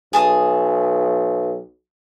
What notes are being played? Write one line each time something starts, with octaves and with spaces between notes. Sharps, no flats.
B1 G#4 A5 D#6